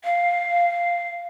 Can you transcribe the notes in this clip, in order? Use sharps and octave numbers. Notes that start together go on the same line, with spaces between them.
F5